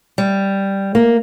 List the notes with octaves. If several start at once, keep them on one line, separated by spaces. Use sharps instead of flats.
G3
A#3